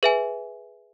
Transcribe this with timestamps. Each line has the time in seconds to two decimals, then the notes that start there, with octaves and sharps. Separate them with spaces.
0.03 G#4 B4 E5 G#5